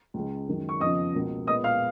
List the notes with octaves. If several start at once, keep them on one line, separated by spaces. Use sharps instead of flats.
C#2 C#3 G#3
F#2 D#3 G#3
C#6
F2 C#3 F3 B3 D#5 D#6
C#2 B2 A#3
A#2 G#3 B3 D#5 D#6
F5 F6